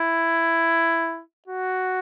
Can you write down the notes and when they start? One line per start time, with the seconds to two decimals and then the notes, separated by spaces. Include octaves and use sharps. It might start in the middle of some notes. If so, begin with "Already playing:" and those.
Already playing: E4
1.48 F#4